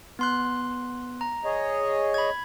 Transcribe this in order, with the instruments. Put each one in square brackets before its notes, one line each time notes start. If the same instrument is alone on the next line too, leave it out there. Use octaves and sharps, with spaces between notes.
[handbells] B3 C6 F#6
A#5
[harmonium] G#4 C#5 D#5
[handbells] B5 G#6